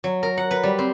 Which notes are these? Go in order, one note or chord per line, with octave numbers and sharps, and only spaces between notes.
F#3
A#4
F#5
B4
G3
C4